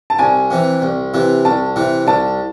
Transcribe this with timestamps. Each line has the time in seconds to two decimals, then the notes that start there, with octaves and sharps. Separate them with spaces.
0.10 A5
0.19 C2 G#5
0.51 C3 E3
0.82 C2
1.14 C3 E3
1.45 C2 A5
1.76 C3 E3
2.07 C2 A5